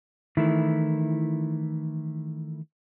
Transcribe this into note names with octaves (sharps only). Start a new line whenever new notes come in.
D#3 E3 A3 E4